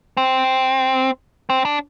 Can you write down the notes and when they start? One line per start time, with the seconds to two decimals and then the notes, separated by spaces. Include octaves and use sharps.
0.17 C4
1.50 C4
1.65 D4